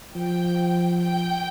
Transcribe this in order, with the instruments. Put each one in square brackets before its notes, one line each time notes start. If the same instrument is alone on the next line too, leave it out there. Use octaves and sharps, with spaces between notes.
[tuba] F3 [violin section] G5
[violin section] G5